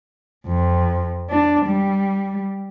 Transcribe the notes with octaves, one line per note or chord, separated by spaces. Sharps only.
F2
D4
G3